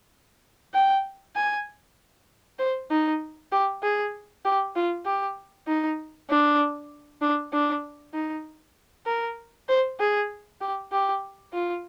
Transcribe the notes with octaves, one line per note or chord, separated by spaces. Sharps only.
G5
G#5
C5
D#4
G4
G#4
G4
F4
G4
D#4
D4
D4
D4
D#4
A#4
C5
G#4
G4
G4
F4